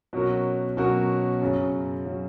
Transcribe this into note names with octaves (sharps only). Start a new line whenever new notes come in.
B2 F#3 C#4 F#4 A#4
B2 F#3 C#4 F#4 A#4
F#2 C#3 F#3
C#3 F#3